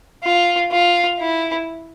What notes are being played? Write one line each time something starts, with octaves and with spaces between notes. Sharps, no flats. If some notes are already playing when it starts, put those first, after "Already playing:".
F4
F4
E4